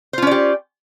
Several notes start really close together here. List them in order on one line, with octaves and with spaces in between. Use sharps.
C5 F4 C#4 D5 G4